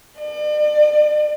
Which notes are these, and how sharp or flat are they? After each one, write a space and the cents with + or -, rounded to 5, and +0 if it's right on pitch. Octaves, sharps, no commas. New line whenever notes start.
D5 +40